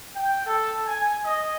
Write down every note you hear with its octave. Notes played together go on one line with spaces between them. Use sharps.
G5
A4
G#5
D#5